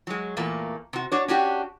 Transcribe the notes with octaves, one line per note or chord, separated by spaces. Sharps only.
F#3 G#3
E2 A#2 A3 A#3
C3 F#4
D4 F#4 C#5
C#4 D4 F#4 G4